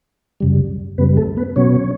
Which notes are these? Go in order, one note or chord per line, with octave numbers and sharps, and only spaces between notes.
F#2 C#3 G3
F#2 C#3 G3 B3 B4
A3 A4
B3 B4
B2 F#3 B3 C#4 C#5